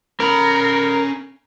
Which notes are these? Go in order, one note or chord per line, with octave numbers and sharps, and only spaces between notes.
C#4 A#4 B5